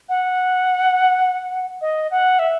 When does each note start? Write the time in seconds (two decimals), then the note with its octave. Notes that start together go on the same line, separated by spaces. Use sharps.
0.09 F#5
1.81 D#5
2.11 F#5
2.39 E5